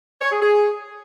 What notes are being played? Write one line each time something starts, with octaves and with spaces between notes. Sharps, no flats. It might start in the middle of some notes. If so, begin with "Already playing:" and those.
C#5
G#4
G#4